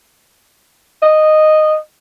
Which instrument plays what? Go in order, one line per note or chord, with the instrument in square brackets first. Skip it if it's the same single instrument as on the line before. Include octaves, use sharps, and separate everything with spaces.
[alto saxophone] D#5